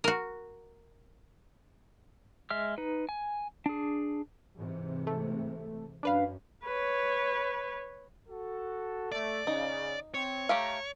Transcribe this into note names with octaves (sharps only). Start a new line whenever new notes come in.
F#4 A#4
G#3 E5 F6
D#4 B4
G#5
D4 G#4
G#2 C3 E3
A3
F#2 C#4 D4 B4 F5
B4 C#5
F#4 A4
A3 D5
C#3 D#4
C4 C#5
A3 G4 F5 A#5